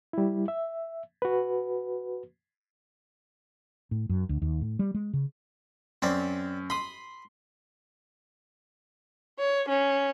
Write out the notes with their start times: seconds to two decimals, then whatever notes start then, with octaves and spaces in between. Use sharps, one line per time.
0.13 G3 E4
0.48 E5
1.22 F#4 B4
3.91 A2
4.09 F#2
4.29 D2
4.42 D#2
4.61 A2
4.79 G3
4.94 G#3
5.13 C#3
6.02 F#2 C4 D5
6.70 B5 C6 D#6
9.39 C#5
9.69 C#4